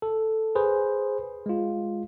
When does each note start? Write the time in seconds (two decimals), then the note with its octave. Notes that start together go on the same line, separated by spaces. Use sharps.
0.02 A4
0.55 G#4 B4 C5
1.46 G#3 F4